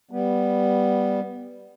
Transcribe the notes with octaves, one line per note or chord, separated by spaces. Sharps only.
G3 B3